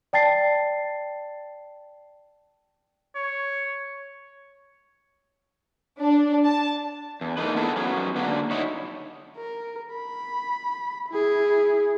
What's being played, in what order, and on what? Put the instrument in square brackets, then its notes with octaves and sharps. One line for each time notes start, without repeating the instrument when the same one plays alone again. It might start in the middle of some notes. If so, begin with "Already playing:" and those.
[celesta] D5 G5 A5 A6 C7
[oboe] C#5
[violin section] D4
A5
[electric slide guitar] E2
E2 A3 A#3 D#4 B4
B3 D4 E4 G#4 A4
F#3 B3 C#4
D3 A#3 D4 F#4
F#3 D#4 E4 C#5
[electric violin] A#4
B5
E4 G#4